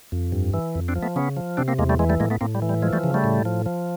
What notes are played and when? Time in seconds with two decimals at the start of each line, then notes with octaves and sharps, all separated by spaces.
0.12 F2
0.32 G2
0.54 E3
0.75 F2
0.88 C4 D4
0.96 F3
1.02 A3 B3
1.16 C#3 B3 C#4
1.36 F3
1.57 C3 C4 D4
1.68 A#3 C4
1.79 E2 G#3 A#3
1.89 G3 A3
1.99 E3 G#3
2.09 G3 A3
2.20 A2 G#3 A#3
2.30 A3 B3
2.41 A2 A#3 C4
2.55 G3
2.62 E3
2.69 G3
2.82 F3 G#3
2.93 G3 A3
3.04 C#3
3.14 G3 A3
3.24 A2
3.45 F3
3.66 F3